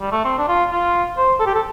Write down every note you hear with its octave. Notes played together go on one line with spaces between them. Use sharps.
G3
A3
C4
D4
F4
F4
C5
A4
G4
A4